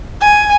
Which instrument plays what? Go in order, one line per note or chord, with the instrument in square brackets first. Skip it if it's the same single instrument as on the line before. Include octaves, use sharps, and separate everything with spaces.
[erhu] G#5